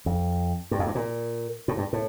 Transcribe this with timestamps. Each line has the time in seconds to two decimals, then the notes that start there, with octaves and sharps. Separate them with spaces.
0.06 F2
0.71 G2
0.79 F2
0.87 G2
0.95 A#2
1.68 A2
1.77 G2
1.93 A2